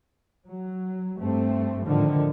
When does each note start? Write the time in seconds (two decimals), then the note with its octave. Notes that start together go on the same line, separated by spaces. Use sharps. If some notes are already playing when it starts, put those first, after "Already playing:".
0.46 F#3
1.17 G2 A3 C4
1.84 A2 D3 D#3 F3